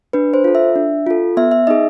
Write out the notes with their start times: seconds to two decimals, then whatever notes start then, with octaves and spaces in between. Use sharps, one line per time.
0.13 D4 B4
0.34 C5
0.44 F4 A4
0.55 E5
0.76 D4
1.07 F4 A4
1.37 B3 E5
1.51 E5
1.67 D#4 G#4 D#5